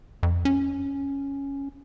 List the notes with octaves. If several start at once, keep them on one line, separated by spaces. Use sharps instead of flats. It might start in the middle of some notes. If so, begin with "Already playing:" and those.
F2
C#4